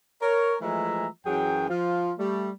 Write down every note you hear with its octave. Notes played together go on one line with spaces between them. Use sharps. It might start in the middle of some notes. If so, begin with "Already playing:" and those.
A#4 C#5
E3 F3 G#3 A3 E5 A#5
F#2 E3 F#3 G#4 G5
F3 F4
G3 A3